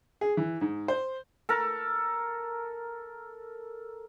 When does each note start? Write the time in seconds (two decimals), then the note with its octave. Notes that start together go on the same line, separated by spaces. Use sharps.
0.21 G#4
0.37 E3
0.61 G#2
0.88 C5
1.49 A4 A#4